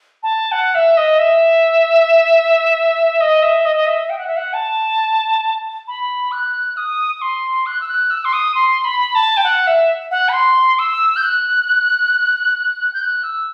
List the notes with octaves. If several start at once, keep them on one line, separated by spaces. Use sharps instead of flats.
A5
F#5
E5
D#5
E5
D#5
E5
D#5
D#5
E5
G5
F#5
E5
F#5
A5
B5
F#6
D#6
D#6
C6
F#6
E6
F#6
E6
C6
D#6
C6
B5
A5
G5
F#5
E5
F#5
B5
C6
E6
G6
F#6
G6
F#6
E6